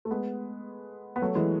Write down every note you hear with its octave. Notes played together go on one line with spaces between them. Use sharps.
A3
G#3 B3
B3
F#3 A3
E3 G#3